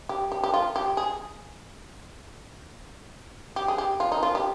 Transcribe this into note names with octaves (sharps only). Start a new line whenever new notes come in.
G4
G4
G4
F4
G4
G#4
G4
G#4
G4
F4
D#4
F4
G4